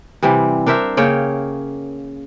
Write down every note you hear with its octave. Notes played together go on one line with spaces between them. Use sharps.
C3 E3 G3 C4
D4 A#4 C5 E5
C#3 A#3 C#5 G5